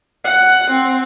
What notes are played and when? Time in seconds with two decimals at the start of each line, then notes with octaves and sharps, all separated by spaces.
0.24 F#5
0.71 C4